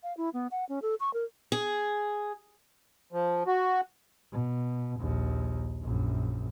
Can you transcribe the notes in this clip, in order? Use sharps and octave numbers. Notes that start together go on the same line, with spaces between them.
F5
E4
B3
F#5
C#4
A4
C#6
A#4
G#4
F3
F#4
B2
A#1 D#2
A#1 F#2